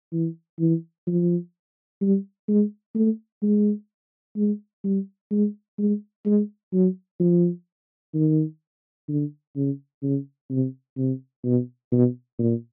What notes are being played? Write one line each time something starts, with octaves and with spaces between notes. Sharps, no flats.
E3
E3
F3
G3
G#3
A3
G#3
G#3
G3
G#3
G#3
G#3
F#3
F3
D#3
D3
C#3
C#3
C3
C3
B2
B2
A#2